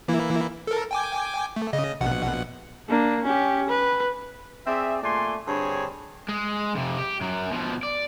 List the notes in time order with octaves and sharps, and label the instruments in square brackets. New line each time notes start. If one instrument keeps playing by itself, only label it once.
[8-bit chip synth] E3 A#3 E4
A4 A#4
G5 G#5 D6
A3
C#3 D#5
A#1 B2 F#5
[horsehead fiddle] A#3 D4
C#4 G4
B4
[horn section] C4 G#4 D5 E5
A#2 A3 D5 G#5 C6
G2 D3 C4 D4 G#4 C#5
[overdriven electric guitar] G#3
F2 C3
G4
F#2 F#3
B2 F3
D5